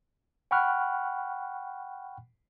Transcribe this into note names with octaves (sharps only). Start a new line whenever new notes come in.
F#5 G5 B5 C#6 F6 F#6